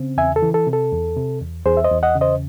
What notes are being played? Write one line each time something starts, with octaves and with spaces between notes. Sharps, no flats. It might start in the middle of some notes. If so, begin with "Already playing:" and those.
Already playing: C#3 C4
E2 E5 G#5
A4
E3
A4
C3
A4
E2
C3
E2
E2 G#4 C5
E5
C5 D#5
E2
D#5 F#5
C#3
C5 D#5